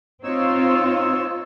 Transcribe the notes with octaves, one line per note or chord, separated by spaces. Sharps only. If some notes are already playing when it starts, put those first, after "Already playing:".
C4 D#4 F4 C#5 E6